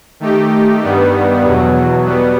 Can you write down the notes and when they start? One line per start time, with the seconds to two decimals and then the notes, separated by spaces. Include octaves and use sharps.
0.20 D#3 A3 D#4 G4
0.82 G2 D#3 G3 B3
1.43 E2 B2 F#3
2.05 B2 G3 B3